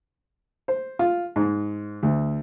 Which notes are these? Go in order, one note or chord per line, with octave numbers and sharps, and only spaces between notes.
C5
F4
G#2
D2